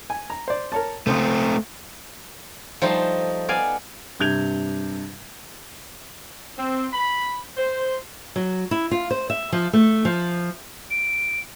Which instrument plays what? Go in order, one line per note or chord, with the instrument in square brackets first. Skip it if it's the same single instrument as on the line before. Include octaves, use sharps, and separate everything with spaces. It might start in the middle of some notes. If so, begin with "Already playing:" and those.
[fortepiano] G#5
A#5
C5 D5
A#4 C#5 A5
[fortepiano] C#2 C5 D#6 [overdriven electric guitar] A3 C4
[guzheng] F3 G3 A3 D#4 C5
B3 D5 F5 G#5
[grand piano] G2 C3 G6 G#6 F7
[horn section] C4
B5
C5
[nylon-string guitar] F#3
E4
F4
C5
E5
F3
A3
F3
[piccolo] D7